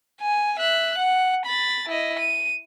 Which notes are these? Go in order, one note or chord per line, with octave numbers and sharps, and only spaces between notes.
G#5
E5 F#6
F#5
B5 A6
E4 D#5
D#7